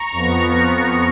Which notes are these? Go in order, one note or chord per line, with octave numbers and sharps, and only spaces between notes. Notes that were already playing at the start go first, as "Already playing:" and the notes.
Already playing: A#5 C#6
F2 F3 B3